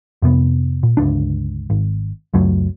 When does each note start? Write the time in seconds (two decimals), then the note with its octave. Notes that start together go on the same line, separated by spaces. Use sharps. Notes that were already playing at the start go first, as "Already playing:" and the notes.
0.22 F2 C3 B3
0.83 A#2
0.97 G1 C#2 D4
1.70 G#1
2.34 C#2 F#2 F#3 A3